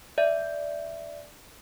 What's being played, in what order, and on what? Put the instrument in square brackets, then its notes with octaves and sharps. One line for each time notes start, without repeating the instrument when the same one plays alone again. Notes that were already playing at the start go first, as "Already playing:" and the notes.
[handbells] D5 E5